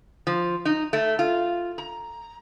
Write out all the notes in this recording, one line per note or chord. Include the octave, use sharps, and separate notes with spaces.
F3
D#4
A3
F4
A#5